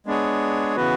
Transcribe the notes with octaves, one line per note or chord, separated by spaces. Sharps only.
G#3 B3 D4 G#4 C#5
C#3 E3 B3 F#4 B4